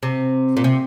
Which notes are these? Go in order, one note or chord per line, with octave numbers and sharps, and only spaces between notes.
C3
A#2
C3